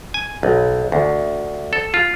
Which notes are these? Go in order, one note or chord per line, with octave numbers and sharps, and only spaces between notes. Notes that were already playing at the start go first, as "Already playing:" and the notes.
G#5
B1
D2
A4
F4